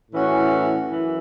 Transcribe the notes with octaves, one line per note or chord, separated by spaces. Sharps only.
A2 E3 C#4 F#4
F#2 E3